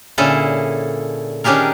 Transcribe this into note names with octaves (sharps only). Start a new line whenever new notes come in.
A#2 D3 C#4 E4 G#4 A4
D#3 C#4 D4 G4 G#4 A#4